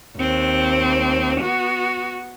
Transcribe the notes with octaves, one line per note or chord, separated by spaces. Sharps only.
D#2 C4
B3 F#4